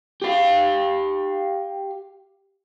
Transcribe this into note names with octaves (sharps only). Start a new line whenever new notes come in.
G4 F5